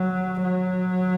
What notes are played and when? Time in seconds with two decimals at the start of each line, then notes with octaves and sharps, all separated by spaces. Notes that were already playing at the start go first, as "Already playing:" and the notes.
Already playing: F#3
0.43 F#3